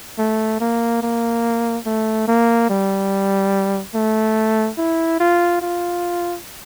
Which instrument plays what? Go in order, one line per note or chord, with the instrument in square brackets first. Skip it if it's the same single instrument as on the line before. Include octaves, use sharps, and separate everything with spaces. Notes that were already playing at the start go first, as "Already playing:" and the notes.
[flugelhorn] A3
A#3
A#3
A3
A#3
G3
A3
E4
F4
F4